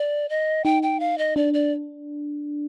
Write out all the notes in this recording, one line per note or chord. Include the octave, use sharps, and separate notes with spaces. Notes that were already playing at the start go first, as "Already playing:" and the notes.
Already playing: D5
D#5
D#4 G5
G5
F5
D#5
D4 D5
D5